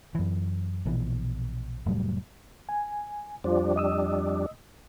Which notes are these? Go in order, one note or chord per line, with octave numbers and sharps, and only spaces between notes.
F#2 E3
A#1 B2 E3
F1 A2 F#3 G3
G#5
F2 G3 D4 F4 C5
D#5 D#6 E6